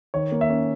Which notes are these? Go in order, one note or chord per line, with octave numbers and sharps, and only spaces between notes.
D#3 C#5
A#3
E5
C#4